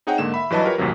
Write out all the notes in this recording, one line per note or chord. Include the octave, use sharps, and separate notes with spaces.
C4 D#4 G#4 C#5 F#5 G5
G#2 D3 A#3 E7
E5 B5
G2 E3 F#3 B4 D#5 A5
F4 G4 A#4 B4 C#5
A#1 D#2 A2 C3 F#3